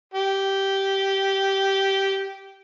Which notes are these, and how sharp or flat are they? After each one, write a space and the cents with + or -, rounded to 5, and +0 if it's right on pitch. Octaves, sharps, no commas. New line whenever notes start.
G4 -10